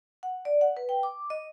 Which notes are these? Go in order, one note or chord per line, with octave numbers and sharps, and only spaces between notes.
F#5
D5
F#5
B4
G5
D6
D#5